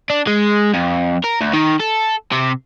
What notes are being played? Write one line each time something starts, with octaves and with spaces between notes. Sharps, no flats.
D4
G#3
F2
A#4
D2
D#3
A4
C3